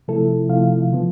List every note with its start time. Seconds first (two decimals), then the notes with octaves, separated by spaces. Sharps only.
0.08 C3 F3 A3 E4 A4
0.49 C3 F3 A3 E4 F5
0.91 D3 F3 B3